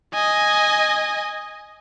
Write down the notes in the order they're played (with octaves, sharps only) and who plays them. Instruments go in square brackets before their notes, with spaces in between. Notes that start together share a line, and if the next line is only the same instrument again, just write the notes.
[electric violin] D#5 G#5